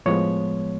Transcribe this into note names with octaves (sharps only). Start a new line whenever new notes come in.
A2 F3 G#3 B3 C#5